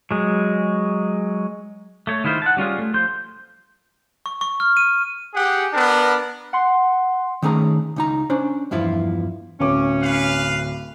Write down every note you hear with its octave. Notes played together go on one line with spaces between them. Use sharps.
F#3 G#3
A3 C#5
D#3 G#3 E4 F4 C5
F#5 A5
G3 C#4 F4 G#4
A3
F3 C6 G6
C#6
C#6
F6
D#7
G4 G#4 F#5
B3 D4 A#4
F#5 C6
D#3 A3 C#4 G#4 A#5
C#2 D#4 A#5
C#4 D4 C5
E2 G2 F3 E4 F4
D1 C#4 D6
B4 F5